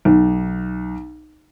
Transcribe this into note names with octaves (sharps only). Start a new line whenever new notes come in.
B1